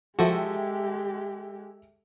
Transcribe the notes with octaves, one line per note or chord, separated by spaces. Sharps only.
F3 G#3 F#4 G4 A4 E5 G5